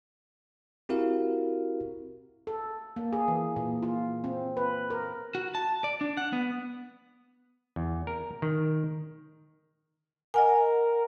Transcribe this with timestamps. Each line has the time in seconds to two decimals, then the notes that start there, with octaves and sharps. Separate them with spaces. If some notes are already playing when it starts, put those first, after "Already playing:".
0.89 C4 E4 F#4 G4 A#4 F5
2.47 A4
2.96 A#3
3.13 G#4
3.28 E3
3.56 A#2
3.83 F4
4.24 C4
4.57 B4
4.90 A#4
5.35 F#4
5.55 A5
5.84 D5
6.01 D4
6.17 F#5
6.33 B3
7.76 E2
8.07 A#4
8.42 D#3
10.34 A#4 D#5 F#5 G#5